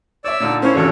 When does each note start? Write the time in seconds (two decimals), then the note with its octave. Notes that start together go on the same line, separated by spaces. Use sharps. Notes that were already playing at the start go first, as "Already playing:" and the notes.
0.25 C#5 D5 E5 E6
0.40 A#2 D3 D#4
0.62 A#3 C#4 E4 C5
0.75 G#1 E2 C3 D4 A4